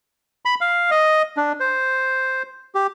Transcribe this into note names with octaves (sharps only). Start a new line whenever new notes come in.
B5
F5
D#5
D4
C5
G4